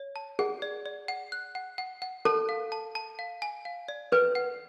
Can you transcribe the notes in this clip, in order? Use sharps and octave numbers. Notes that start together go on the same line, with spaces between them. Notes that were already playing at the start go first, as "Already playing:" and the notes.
Already playing: C#5
A5
G#4 F#5
D5
D5
F#5
F#6
F#5
F#5
F#5
A4 A5
F5
A5
A5
F5
G#5
F5
D5
A4 B4
F#5